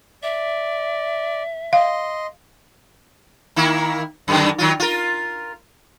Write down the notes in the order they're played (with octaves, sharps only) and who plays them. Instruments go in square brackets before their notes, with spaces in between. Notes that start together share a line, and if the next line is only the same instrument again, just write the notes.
[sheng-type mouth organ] D5 [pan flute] E5
[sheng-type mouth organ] D#5 C6 [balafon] F5
[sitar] D#3 A#3 E4
F#2 D3 D#3
D#3 F#3 F4
F4 A#4